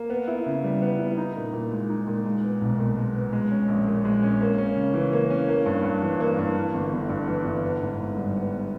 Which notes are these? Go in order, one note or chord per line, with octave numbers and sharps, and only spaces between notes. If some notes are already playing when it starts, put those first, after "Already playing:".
Already playing: A#3
B3
E4
C#3
G3
B3
E4
D#4
A#2
A#2
G#3
D#4
A#2
G#3
B3
B1
A#2
G#3
B3
G#3
C#4
A#1
A#2
G#3
C#4
A#3
C#4
C#3
E3
A#3
C#4
A#3
G2
G2
E3
A#3
G2
E3
G1
G1
G2
E3
G1
B3
G#2
G#2
G3
B3